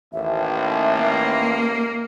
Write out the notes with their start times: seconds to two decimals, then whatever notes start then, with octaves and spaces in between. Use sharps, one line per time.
0.12 A1 D#2 E5
0.94 A#3